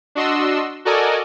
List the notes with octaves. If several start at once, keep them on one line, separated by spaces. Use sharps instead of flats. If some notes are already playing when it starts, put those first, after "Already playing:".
D4 F#4 D#5 C6 E6
F#4 A4 A#4 D5 D#5 G#5